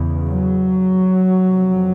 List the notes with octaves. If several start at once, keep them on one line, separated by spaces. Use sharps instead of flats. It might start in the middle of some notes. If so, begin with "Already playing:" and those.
Already playing: E2 C#3
F#3
F2 C3